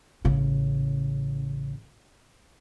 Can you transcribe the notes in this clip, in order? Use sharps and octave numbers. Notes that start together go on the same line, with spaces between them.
A1 C#3